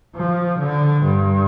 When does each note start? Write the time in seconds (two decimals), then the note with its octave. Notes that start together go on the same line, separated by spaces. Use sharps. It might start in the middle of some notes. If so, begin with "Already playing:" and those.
0.16 F3
0.59 D3
1.04 G2